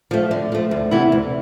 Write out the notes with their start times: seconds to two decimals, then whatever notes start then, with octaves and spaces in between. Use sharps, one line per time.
0.11 F3 A3
0.31 D3
0.52 F3 A3
0.71 D2
0.91 C3 E3 B3 E4
1.12 D2